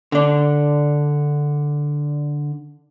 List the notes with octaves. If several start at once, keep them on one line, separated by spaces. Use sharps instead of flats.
D3 D4